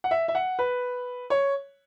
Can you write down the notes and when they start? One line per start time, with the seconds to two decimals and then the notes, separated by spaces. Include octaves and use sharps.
0.04 F#5
0.11 E5
0.28 E5
0.35 F#5
0.59 B4
1.30 C#5